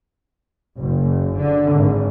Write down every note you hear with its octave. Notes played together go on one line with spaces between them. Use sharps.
F#1
D3
G#1